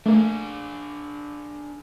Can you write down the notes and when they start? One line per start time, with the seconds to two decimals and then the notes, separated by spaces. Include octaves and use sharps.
0.06 A3 A#3 D4 G#4